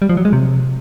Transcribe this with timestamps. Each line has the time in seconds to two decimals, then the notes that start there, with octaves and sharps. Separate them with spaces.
0.02 G3
0.09 F3
0.17 F#3
0.25 G#3
0.33 C3